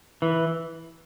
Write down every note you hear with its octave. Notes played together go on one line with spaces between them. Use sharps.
E3